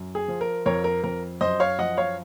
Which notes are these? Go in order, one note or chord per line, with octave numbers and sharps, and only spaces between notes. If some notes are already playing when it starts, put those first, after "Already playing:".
Already playing: F#2
G#4
F3
A#4
F2 A#4 C#5
A#4
F2 A#4
F#2 C5 D#5
C#5 F5
F3 D#5 F#5
C#5 F5